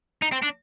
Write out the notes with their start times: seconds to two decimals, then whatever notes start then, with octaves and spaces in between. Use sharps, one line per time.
0.22 D#4
0.32 C4
0.43 D4